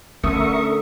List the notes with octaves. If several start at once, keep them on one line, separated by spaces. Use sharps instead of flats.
D3 A3 C#4 A#4 E5 C#6 D#6